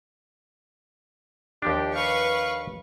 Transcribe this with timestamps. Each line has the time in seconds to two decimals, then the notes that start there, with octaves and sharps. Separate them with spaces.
1.62 D#2 F3 D4 G4
1.95 B4 F5 C#6